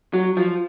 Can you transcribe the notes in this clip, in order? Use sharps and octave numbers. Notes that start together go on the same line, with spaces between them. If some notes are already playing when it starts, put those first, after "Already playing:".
F#3
F3